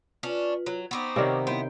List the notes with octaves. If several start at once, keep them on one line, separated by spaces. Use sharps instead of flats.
C#4 D4 F4 B4
F#3
B3 C4 D#4 C#6 D6
C3 D#3 C#5 D5 F5
B3 E4 C5 C#5 G5